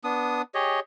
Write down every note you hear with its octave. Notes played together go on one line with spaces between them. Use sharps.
B3 D4 D#6
G4 G#4 C#5 D#5